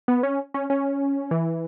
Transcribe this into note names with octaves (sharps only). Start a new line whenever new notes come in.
B3
C#4
C#4
C#4
E3